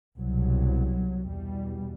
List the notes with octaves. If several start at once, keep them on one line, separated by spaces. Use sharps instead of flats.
C2 B2 F#3
E2 B2 G3